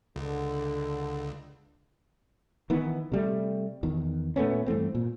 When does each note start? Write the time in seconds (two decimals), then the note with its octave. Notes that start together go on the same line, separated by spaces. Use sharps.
0.16 C#2 D3
2.70 D#3 E3 B3
3.12 C3 G3 A3
3.83 E2 D#3
4.36 A#2 A3 B3 C#4
4.66 G2 E3 A3 C4
4.95 A#2